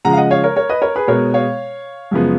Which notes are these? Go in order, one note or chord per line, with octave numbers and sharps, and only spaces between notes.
C#3 F3 G#3 F#5 A#5
F5
D#5 F#5
C#5 F5
A#4 C#5
A#4 C#5
B4 D#5
A#4 C#5
G#4 B4
B2 G#3 B3 A#4 C#5
C#5 F5
F#2 C#3 F3 G#3 B3